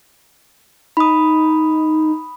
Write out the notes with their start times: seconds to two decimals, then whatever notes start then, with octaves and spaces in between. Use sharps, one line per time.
0.97 D#4 B5 D#6